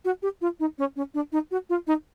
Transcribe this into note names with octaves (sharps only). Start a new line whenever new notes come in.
F#4
G4
F4
D#4
C#4
C#4
D4
D#4
F#4
F4
D#4